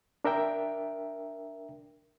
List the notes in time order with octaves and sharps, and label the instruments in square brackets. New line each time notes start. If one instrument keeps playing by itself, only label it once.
[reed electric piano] D4 A#4 E5 G5